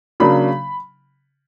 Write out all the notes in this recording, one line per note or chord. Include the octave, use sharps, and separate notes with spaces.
C#3 F#3 A#3 D4 B5